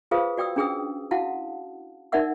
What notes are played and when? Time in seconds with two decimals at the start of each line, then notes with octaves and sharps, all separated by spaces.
0.11 F4 G#4 B4 C5 F5 D#6
0.37 F#4 D5 G5 D#6 E6
0.56 C#4 D4 G#4 G5 D#6 E6
1.11 E4 F#4 F5 F#5 A5
2.12 D#4 A#4 D5 E5 F#5 E6